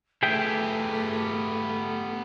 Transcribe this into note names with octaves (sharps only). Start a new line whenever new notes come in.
A3 B3 G4 G#4 E5 G5